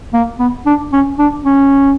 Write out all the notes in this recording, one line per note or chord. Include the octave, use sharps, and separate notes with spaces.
A#3
B3
D4
C#4
D4
C#4